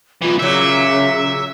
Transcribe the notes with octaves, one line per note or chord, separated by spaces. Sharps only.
B1 E3 F4
A#2 C#3 F#3 E5